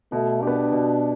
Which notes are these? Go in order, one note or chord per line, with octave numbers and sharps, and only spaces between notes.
B2 A3
B3 D4 G4
B2